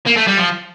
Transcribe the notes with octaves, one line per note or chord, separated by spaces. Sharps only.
A#3
A3
G3
F3